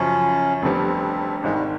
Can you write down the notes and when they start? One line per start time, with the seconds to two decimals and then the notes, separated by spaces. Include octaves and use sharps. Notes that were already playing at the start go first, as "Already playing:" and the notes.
Already playing: F#2 C#3 F3 C#4
0.62 F1 F2 D3 G3 B3 C4
1.44 G#1 G#2 D#3 G#3
1.54 G3